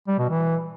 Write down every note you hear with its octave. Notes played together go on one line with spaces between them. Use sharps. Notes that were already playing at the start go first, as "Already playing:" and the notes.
G3
B2
E3